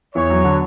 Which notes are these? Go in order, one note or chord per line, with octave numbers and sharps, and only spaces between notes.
E2 C#5
F#3
D3